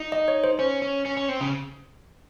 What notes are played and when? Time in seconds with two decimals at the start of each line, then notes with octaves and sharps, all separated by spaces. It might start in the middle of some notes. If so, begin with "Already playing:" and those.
Already playing: D#4
0.12 D#5
0.28 C#5
0.44 C5
0.59 C#4 C5
0.82 C#4
1.06 C#4
1.17 C#4
1.29 C4
1.41 C#3